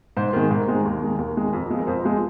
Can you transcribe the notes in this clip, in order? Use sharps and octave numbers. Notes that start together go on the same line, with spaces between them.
G#2 C5
D#3 G#3
G#2 A#4
D#3 G#3
D#2
D#3 G#3
D#2 A#4
D#3 G#3
F2
F3 G#3
A#4
F2 C5
F3 G#3